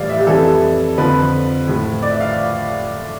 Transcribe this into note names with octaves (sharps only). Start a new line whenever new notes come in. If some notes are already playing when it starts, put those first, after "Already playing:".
Already playing: A2 E3 G3 D5 F5
E5
G4
F2 E3 G3 A4
F2 D3 F3 B4
A2 F3
D5
E5
F5